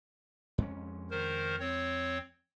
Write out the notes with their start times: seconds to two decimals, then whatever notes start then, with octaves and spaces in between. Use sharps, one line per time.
0.58 F2 G#3 C#4
1.11 D#3 A#4 C5
1.60 C4 C#5